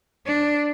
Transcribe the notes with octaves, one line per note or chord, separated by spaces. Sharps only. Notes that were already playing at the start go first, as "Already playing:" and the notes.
D4